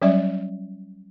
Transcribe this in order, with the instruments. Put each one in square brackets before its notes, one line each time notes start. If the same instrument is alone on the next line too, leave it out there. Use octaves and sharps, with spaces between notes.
[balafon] F#3 G3 C#4 D5 E5